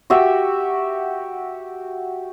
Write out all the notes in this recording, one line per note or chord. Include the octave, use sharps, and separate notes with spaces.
F#4 G4 E5